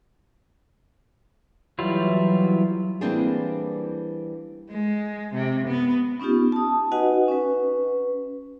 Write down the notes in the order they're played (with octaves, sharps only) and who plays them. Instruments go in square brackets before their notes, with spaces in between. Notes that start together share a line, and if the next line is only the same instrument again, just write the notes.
[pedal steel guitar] E3 F#3 G3 E4 F4
[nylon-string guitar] E3 G3 A#3 C4 D4 G#4
[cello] G#3
C3
B3
[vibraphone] B3 C#4 D#4 F4 G4
A5 D#6
D#4 F#4 B4 D#5 F#5 G#5
C#4 B4